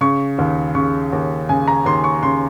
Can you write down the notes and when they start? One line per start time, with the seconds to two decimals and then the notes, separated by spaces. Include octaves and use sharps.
0.01 C#3 C#6
0.38 D#2
0.75 C#3 C#6
1.13 D#2
1.49 C#3 G#5
1.68 A#5
1.86 D#2 C6
2.04 C#6
2.23 C#3 C6